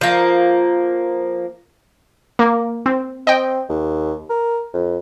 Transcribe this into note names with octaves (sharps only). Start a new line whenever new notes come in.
F3 A#3
A#3
C4
C4 D#5 G5
D#2
A#4
F2